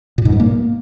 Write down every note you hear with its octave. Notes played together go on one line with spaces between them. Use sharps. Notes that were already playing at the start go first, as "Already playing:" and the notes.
A#2
G#2
G2
A#3